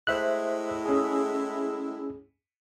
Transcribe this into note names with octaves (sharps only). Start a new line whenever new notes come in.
A2 G#3 E4 C5 E5 F#6
C#4 G#4